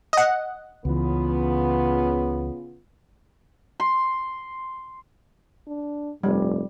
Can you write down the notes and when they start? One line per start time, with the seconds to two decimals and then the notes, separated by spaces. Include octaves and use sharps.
0.13 D#5 F#5
0.85 C#2 C#3 E3 B3 F4
3.80 C6
5.67 D4
6.23 F1 G2 G3